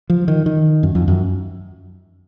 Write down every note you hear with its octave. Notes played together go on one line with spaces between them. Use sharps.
F3
D#3
D#3
F#2
F2
F#2